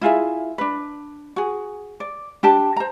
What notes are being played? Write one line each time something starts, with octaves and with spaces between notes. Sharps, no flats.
E4 F4 G#4 E5
D4 B4
F#4 G#4
D5
D4 G4 A5
C5 A#5